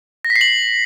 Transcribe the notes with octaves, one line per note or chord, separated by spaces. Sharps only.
A#6
B6
C7
F#7